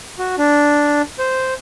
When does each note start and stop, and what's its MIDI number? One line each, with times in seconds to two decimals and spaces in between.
0.18 0.35 66
0.38 1.02 62
1.19 1.54 72